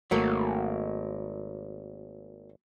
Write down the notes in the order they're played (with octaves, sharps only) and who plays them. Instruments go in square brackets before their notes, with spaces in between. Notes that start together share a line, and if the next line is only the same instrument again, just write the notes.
[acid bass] G#1 [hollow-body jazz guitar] F#3 A3 A#3